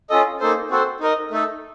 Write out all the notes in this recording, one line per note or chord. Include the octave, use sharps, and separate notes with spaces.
C#4 F4 A4 D#5
A#3 D#4 A4 C5
C4 F#4 A4 C5
D#4 A#4 D#5
A3 D#4 A4